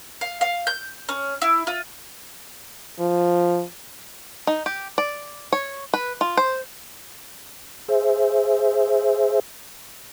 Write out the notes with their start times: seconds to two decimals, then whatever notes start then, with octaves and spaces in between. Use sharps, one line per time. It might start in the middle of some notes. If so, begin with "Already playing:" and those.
0.21 F5
0.41 F5
0.67 G6
1.09 C#4
1.42 E4
1.67 F4
2.99 F3
4.47 D#4
4.66 G4
4.98 D5
5.53 C#5
5.94 B4
6.21 F4
6.37 C5
7.88 G#4 C5 E5